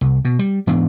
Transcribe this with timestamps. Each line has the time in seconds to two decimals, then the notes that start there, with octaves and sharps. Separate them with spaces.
0.01 C2
0.25 B2
0.39 G3
0.67 G#2 E3 B3 D4